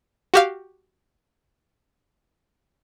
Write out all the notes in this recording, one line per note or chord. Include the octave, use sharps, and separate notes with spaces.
F#4 G4 F5